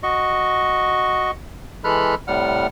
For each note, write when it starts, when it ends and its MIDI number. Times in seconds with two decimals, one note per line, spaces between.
0.03 1.31 66
0.03 1.31 75
0.03 1.31 85
1.84 2.15 52
1.84 2.15 56
1.84 2.15 69
1.84 2.15 83
1.84 2.15 89
1.84 2.15 90
2.28 2.67 45
2.28 2.67 48
2.28 2.67 55
2.28 2.67 78
2.28 2.67 89